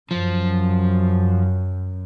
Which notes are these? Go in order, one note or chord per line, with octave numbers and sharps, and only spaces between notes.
F#2 F3